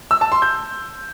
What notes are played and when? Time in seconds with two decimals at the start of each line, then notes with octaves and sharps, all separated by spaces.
0.11 E6
0.21 A5
0.32 C6
0.42 G6